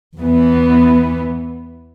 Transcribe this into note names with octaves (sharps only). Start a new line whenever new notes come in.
E2 E3 B3